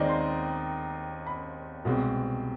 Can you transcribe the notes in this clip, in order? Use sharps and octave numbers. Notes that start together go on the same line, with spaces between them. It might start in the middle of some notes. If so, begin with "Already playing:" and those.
Already playing: D#2 D#3 G#3 C4 C5 D5 D#5
C6
B5
C2 B2 G#3 C4